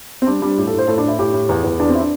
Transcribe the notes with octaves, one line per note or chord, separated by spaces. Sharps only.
C4
G3 D4
G3 D4
A2 G4
A4
A2
C5
A2 A4
A2 D4
E4
A2 G4
A2
E2
E2
E2 D4
C4
E4
D4